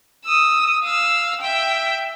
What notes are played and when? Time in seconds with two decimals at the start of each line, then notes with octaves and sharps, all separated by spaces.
0.25 D#6 E6
0.84 F5 E6
1.41 E5 G5